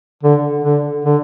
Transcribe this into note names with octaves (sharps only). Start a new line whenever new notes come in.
D3
D3
D3